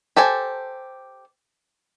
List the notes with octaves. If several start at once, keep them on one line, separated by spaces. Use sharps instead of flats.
G4 A4 C5 G#5